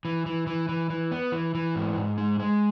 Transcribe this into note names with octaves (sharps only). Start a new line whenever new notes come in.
E3
E3
E3
E3
E3
B3
E3
E3
G#2
G#2
G#3
G#3